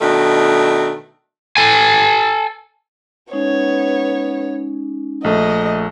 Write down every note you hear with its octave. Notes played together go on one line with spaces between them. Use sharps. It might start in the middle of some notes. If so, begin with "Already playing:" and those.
B2 D#3 A3 D4
A4 G#5
G#3 B3 C#4 D#4 C#5
A#1 A3 D#5